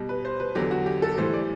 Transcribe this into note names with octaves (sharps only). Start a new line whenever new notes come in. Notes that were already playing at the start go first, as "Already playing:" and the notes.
Already playing: B2 G3
B4
C5
B4
E2 D3 F#3 G4
F#4
G4
A4
A2 E3 G3 C5
D5